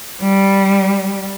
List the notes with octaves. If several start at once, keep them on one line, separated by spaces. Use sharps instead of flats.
G3